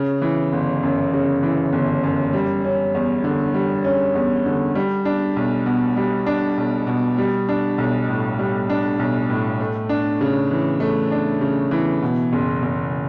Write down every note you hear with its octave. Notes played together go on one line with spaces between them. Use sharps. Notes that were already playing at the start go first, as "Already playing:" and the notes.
Already playing: C#3
E3
G1
F#2
C#3
E3
G1
F#2
G3
C#4
E2
D3
G3
C#4
E2
D3
G3
D4
B1
B2
G3
D4
B1
B2
G3
D4
B1
A2
G3
D4
B1
A2
A3
D4
C#3
E3
A3
D4
C#3
E3
B2
F#1
F#1